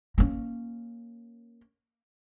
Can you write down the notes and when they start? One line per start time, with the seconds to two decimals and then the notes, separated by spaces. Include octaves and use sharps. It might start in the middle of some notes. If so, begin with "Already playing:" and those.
0.18 A#3 C#4